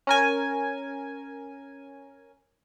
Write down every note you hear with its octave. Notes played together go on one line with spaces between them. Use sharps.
C#4 A#4 G#5